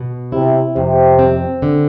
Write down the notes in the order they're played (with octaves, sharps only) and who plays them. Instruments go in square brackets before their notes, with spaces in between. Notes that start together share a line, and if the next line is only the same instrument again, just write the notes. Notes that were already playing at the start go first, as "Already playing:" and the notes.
Already playing: [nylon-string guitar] B2
[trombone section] C3 [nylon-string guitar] E4
[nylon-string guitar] F2 [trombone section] C3
[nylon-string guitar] C4
D3